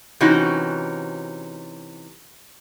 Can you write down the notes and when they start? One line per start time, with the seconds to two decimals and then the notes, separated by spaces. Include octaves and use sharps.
0.21 C3 E3 C#4 D#4 F#4